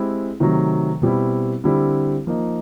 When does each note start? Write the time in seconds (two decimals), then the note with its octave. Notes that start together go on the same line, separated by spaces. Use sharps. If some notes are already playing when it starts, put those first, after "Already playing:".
Already playing: G#3 C4 E4 G4
0.40 C3 D#3 F#3 A3
1.02 B2 G3 C4 E4
1.64 D3 G3 C4 E4 G4
2.27 F3 A#3 D#4